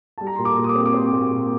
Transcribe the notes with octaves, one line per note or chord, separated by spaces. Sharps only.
G3 A5
A#5
A#2 C6
D6
A#2
D#6
D6
C4
D6
C4 C6
A#2
A#2